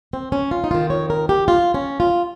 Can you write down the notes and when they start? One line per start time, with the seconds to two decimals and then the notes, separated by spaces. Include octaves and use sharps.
0.13 C4
0.32 C#4
0.51 F4
0.64 D#4
0.71 F2 D#3 F4
0.90 C#5
1.10 A#4
1.29 G4
1.48 F4
1.74 C#4
2.00 F4